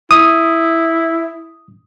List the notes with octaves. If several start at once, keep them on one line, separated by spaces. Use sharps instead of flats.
E4 D#6